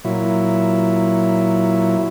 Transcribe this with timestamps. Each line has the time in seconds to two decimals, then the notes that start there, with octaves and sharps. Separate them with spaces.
0.05 A#2 F#3 E4